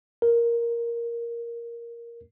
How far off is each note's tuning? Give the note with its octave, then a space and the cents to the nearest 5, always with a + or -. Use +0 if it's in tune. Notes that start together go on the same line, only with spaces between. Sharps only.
A#4 +5